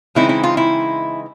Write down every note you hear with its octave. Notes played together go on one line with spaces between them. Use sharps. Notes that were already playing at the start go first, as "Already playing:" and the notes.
C#3 E3 G#3 C4 D#4 E4
E4
F4
E4